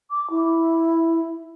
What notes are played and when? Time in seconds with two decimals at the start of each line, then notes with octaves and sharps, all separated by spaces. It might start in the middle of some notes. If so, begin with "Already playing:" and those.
0.10 D6
0.30 E4